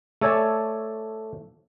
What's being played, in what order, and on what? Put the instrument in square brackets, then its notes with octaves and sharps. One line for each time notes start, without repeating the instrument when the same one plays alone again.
[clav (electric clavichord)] A3 A4 C#5 D5 G#5 A5